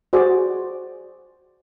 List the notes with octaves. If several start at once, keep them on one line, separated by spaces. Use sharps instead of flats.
F#4 G#4 C5 D5